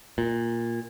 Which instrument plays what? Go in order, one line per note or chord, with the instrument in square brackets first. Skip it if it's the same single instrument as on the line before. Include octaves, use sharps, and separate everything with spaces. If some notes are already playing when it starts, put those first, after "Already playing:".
[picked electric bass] A#2